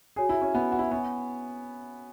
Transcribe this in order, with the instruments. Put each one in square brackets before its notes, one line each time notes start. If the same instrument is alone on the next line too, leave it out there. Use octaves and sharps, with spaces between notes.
[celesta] F#4 C#5 G#5 [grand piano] G#4
[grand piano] E4
C#4
B3
F#4
E4
[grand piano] B3 [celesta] C#5 G#5 C#6